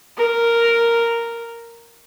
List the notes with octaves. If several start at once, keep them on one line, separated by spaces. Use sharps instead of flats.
A#4